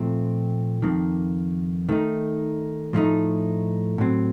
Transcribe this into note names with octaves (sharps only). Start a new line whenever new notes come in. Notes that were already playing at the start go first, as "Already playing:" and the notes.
Already playing: A#2 F3 A3 C4
F2 D#3 A#3
D#3 A3 D#4
A2 F3 A3 D#4
A2 F#3 C4